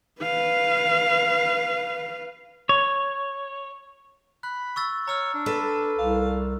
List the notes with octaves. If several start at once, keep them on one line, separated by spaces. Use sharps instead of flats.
B4 F5
C#5
B5 F#6
C#6 E6 A6
C#5 A#5 E6 F6
D4
A4 B4
C2 F5